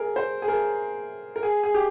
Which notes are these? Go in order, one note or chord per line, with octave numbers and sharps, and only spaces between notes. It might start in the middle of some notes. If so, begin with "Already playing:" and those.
Already playing: G#4 A#4
C5
G#4
A#4
A#4
G#4
G#4
G4